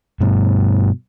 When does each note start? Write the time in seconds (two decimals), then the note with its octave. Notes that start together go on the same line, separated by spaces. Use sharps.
0.21 G2 B2